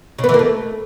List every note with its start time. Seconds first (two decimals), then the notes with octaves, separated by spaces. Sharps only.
0.19 C#3
0.24 B3
0.29 E3
0.34 A#3
0.39 A3